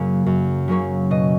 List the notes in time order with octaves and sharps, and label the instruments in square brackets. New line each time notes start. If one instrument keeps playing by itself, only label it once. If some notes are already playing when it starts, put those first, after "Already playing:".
Already playing: [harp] F#2 C#3 F#3 A#3 C#4
F#2
C#3 F#3 A#3 C#4
B2 D#5